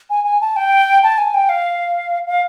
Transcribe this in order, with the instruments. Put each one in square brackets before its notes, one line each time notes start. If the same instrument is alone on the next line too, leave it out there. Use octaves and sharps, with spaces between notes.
[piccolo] G#5
G#5
A5
G5
A5
G#5
G5
F5
F5